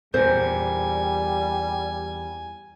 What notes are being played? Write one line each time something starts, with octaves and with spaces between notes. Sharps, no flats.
E2 A#2 G3 C5 G#5